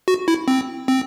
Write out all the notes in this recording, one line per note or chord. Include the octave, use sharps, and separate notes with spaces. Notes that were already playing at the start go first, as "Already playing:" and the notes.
F#4
E4
C4
C4